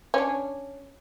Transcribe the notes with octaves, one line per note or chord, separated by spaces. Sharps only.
C#4 D4